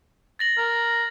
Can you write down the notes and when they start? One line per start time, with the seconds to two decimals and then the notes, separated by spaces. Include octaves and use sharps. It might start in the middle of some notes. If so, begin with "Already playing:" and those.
0.39 A6 A#6 F#7
0.57 A#4